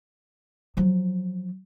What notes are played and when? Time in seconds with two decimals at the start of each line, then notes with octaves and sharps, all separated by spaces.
0.77 F3 F#3